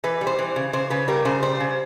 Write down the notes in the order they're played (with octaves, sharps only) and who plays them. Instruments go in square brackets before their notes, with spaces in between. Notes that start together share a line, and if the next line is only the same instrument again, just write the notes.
[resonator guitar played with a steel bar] E3 B4
G3
C5
E3
C#3
C#3 C5
C#3 B4
G3 A#4
C#3 C5
G3 C5
C#3